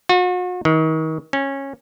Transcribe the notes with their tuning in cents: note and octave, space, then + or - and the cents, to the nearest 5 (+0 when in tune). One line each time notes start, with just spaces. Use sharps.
F#4 -40
D#3 +35
C#4 -15